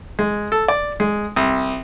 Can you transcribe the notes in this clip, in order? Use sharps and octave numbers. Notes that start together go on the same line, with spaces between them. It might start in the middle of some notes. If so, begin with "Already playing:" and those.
G#3
A4
D5
G#3
C2